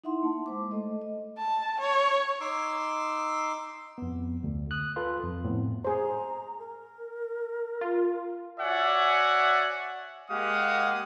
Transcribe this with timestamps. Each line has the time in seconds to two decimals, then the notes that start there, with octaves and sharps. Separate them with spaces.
0.04 D#4 E4 E5 F#5 C6
0.23 A#3 A5
0.46 G#3 C5 D6
0.71 A3 A4 D#5
1.02 D#5
1.38 A5
1.81 C#5
2.41 D#4 C6 D6 E6
3.98 F2 B3
4.43 D2
4.71 D#6 F#6
4.96 F4 A4 B4 F5 C6
5.23 F2
5.44 A2 B3 C4
5.85 G#4 C5 A#5
6.59 A#4
7.81 F4
8.59 F#4 C#5 D5 E5 F#5 G#5
10.30 G#3 A#3 G4 F5 F#5 D#6